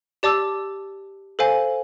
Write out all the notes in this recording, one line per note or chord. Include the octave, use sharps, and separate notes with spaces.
G4 D5 A5 D6 E6
A4 C5 F5 G#5